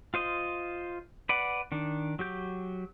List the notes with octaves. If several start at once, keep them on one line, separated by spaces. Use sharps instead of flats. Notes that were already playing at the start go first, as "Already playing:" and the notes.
F4 C5 D#5
B4 D5 F#5
D#3 D4
F#3 G4 G6